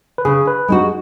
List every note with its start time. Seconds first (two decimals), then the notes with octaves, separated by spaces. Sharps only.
0.18 B4
0.25 C#3 G#4
0.48 B4
0.68 G#3 D#4 F#4 G#4